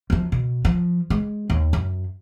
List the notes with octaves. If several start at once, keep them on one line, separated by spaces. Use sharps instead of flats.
F#2 F3
B2
F3
G#3
D#2
F#2